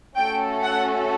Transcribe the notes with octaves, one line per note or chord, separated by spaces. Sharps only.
A3 C#4 F#4 A4 G5
F#5